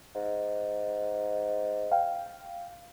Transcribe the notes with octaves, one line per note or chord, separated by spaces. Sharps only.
G#2
F5 G5